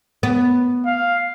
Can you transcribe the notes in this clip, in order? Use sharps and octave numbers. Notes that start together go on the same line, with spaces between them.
B3
F5